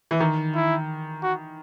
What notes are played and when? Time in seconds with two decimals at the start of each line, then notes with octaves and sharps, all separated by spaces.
0.11 E3
0.20 D#3
0.55 E4
1.23 F#4